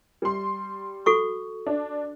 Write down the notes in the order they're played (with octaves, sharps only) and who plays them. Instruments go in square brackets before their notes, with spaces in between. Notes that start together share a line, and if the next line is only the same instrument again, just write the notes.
[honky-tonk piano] G3 C6
[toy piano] F#4 A4 C#6
[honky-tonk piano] D4